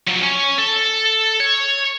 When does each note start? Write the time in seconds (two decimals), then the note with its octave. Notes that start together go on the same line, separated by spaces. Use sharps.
0.08 F3 F#3
0.23 C#4 G#5
0.58 A4
1.40 C#5